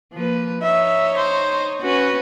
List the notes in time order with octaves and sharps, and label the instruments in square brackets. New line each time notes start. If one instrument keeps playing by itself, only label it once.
[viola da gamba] F3 A#3 B4
[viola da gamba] D#4 C#5 [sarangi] E5
[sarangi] C5
[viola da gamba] C#4 B4 [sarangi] F#4